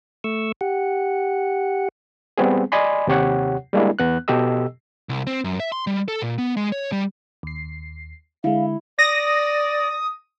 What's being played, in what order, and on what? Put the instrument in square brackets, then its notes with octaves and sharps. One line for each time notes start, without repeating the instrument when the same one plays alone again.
[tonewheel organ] A3 C#6 E6
G4 F#5
[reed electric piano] G3 B3 C4 G#4
D5 D#5 G#5 B5 C6
D#2 C3 G4 C#5 F#5
G3 G#3 A#3 D4 E4
E2 B3 F#6
B2 G4 A4 D#5 E6
[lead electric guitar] C2
C4
F#2
E5
C6
G3
A4
A#2
B3
G#3
C#5
G3
[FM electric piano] D#2 C7
[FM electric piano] D3 G#3 [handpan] E4 [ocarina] F5
[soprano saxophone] D5 [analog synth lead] D#6 [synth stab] A#6